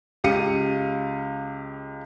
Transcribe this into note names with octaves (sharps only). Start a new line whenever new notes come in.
C#2 G4 F5 C#7 D#7